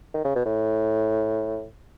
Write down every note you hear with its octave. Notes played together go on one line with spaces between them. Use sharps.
D#3
C#3
B2
A2